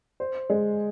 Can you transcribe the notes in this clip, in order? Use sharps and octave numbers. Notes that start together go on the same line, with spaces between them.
C5
G#3